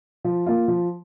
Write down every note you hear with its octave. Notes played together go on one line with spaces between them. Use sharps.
F3
A#3 F4
F3